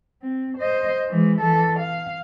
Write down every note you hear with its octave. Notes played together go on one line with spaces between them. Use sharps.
C4
C5 D#5
E3 G#3
E3 A4
F5